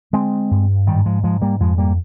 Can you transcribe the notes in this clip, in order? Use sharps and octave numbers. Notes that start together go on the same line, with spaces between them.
D3 G#3 C4
G2
G#2 D#3 G3
F3 G#3
G#2 F3 G#3
G3 A#3
F2 F3 G#3
G3 A#3